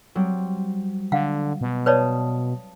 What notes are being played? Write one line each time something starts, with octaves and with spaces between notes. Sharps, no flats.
F#3 G3 C4
D3 F5 F#5
B2
B4 C#5 D5 F5 A5 D#6